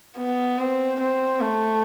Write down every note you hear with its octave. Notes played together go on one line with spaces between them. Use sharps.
B3
C4
C4
A3